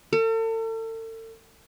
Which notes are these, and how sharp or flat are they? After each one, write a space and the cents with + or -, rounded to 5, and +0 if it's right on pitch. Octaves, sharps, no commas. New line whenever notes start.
A4 +40